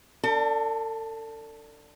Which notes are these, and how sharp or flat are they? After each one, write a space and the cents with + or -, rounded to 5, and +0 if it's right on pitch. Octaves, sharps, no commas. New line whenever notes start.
D4 +0 A4 +40